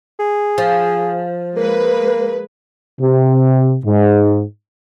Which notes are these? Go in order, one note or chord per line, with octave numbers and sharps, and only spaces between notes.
G#4
F3
G#3 A#3 B4
C3
G#2